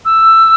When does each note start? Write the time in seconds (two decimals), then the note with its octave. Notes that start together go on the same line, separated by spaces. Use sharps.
0.05 E6